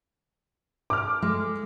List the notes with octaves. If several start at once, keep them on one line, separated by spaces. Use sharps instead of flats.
D6 F6
G#3